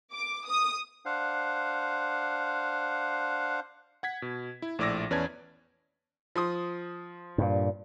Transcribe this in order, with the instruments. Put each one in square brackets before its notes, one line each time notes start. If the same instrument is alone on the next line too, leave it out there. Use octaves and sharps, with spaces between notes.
[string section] D6
D#6
[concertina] D4 C5 F5 F#5
[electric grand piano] F#5 G#6 B6
B2
E4
A#1 A2 D5 D6 E6 A#6
E2 C#4 B4 D5 A5 G#6
[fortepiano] F3 C6 D#6
[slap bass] G2 A#2